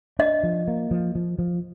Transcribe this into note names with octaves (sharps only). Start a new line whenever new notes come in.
D4 D#5
F3
A#3
F3
F3
F3